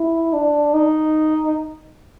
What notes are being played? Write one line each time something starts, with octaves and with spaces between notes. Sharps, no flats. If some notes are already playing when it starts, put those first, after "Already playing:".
Already playing: E4
D4
D#4